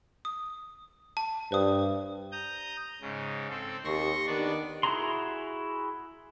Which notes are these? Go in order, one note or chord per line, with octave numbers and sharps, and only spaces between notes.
D#6
A5
G2 C5 D#6
A#5 D#6 G6
G#2 C#3
C4 A4
D#2 G4 C6 C#6 A#6
D#3 B3 D4 D5
E4 F#4 G#4 A#5 C6